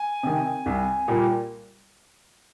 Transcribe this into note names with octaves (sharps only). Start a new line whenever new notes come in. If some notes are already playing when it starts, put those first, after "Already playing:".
Already playing: G#5
C3 D#3
C2
A#2 G3 A#3